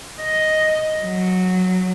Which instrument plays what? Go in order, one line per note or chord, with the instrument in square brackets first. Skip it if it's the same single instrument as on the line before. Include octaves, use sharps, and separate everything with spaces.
[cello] D#5
F#3